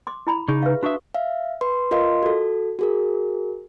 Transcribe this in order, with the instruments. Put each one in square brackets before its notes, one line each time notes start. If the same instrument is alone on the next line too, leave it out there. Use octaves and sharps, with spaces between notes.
[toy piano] C6 D6
E4 A#5 B5
[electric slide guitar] C#3 D#4 [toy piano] G#4 C#6
[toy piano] B4 E5 F5
[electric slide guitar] D4 E5 [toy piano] F#4 C#6 D#6
[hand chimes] E5 F5
B4 C6
F4 A#4 D#5 F5 C6
F#4 A4
F#4 G#4 A#4